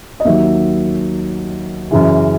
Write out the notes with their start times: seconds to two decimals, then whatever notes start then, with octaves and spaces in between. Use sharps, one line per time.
0.20 D#5
0.25 D#2 D#3 F#3 E5
1.91 F#2 C#3 E3